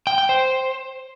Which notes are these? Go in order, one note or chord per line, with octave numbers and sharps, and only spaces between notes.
G5
G5
C5